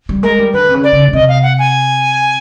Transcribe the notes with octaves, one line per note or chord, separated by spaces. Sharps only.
G3
G#3 A#4
G3
D3 B4
C3
C#3
D5
C#3
C#3
C3 D#5
F5
F#5
G#5